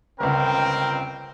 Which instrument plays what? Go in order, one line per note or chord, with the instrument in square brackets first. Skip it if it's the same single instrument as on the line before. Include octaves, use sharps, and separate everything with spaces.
[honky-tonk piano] G1 C#2 [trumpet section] C4 G5 [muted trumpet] A#4